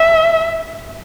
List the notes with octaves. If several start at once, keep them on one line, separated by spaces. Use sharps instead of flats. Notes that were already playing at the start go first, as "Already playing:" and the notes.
Already playing: E5